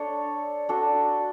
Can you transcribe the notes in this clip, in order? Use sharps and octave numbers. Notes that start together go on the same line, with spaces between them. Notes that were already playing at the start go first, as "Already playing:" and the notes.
Already playing: D4 A4 C#5
D4 F#4 A4